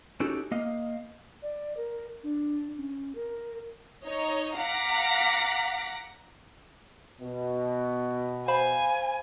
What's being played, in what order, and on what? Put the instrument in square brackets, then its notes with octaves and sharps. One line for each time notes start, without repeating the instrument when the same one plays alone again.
[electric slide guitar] C#4 D#4 F#4 G4 A4
A#3 D#5 F5
[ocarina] D5
A#4
D4
C#4
A#4
[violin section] D#4 C#5 D#5
F5 F#5 A#5 D6 A#6 B6
[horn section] B2
[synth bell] C5 F5 B5 [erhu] G#5